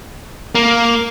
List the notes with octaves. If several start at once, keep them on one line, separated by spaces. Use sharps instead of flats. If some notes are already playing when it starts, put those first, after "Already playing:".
A#3